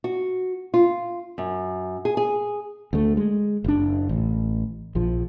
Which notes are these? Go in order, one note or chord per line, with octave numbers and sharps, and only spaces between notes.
F#4
F4
F#2
G#4
G#4
D2 A3
G#3
F#1 D4
A1
A#1 F3